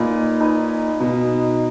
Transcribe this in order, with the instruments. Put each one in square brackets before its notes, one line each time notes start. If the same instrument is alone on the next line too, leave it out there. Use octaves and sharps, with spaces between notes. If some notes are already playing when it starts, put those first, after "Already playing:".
Already playing: [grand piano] A#2 [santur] D#4 G#4 B4
[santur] D#4 G#4 B4
[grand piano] B2 [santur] D#4 G#4 B4